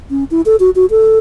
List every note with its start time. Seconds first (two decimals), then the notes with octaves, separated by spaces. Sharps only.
0.11 C#4
0.31 E4
0.46 A4
0.60 F#4
0.75 F#4
0.90 A4